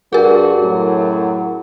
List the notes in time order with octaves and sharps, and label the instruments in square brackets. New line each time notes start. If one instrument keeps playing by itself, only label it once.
[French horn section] G2 F#4 [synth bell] G#4 A#4
[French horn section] F#2 A2 F#3